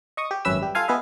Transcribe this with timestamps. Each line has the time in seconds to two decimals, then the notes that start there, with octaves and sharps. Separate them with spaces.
0.17 D#5 C#6 D#6
0.31 G4
0.45 G#1 F#2 C#4 B4 E5 E6
0.62 G3 G4
0.75 F4 A4 F5 G#5
0.88 B3 G#4 B4 D#5 E5